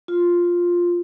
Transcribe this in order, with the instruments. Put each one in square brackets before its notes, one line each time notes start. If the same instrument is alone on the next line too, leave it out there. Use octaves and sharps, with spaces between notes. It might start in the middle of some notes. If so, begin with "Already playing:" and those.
[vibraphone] F4